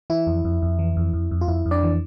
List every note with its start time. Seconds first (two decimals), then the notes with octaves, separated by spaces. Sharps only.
0.10 E3 E4
0.27 F2
0.45 F2
0.62 F2
0.79 E3
0.97 F2
1.13 F2
1.31 F2
1.41 F4
1.48 F2 E4
1.66 F2
1.71 D4 D5
1.83 E3